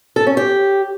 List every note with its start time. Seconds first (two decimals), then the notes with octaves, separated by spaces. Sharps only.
0.16 A4
0.27 C#4
0.37 G4